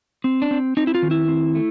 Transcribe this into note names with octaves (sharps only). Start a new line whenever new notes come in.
C4
D4
C4
C4 D#4
E4
F4
D#3
E4
C4
A3